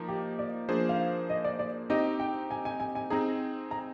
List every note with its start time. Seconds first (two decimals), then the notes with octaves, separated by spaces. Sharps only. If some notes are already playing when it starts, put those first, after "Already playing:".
Already playing: F3 A#3 D#4
0.08 G4
0.39 D5
0.69 F3 A#3 D4 G#4 C5
0.89 F5
1.29 D#5
1.45 D5
1.59 D5
1.90 C4 D#4 G4 D#5
2.20 G5
2.51 G#5
2.65 G#5
2.80 G#5
2.95 G#5
3.10 C4 D#4 G#4 A#5
3.71 A#5